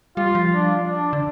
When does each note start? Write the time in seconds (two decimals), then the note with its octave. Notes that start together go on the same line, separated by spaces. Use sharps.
0.17 G3 F4
0.35 F3
0.52 D4
0.87 D4
1.13 D3